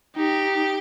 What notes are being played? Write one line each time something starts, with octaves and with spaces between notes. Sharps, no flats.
D#4 G4